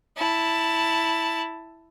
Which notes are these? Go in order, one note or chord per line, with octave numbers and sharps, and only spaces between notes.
E4 A5